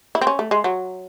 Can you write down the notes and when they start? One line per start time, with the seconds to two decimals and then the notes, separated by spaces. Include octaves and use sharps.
0.15 E4
0.21 C4
0.27 C#4
0.39 A3
0.51 G#3
0.64 F#3